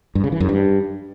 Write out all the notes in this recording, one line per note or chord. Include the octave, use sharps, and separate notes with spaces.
G2
C#3
E3
F#2
G2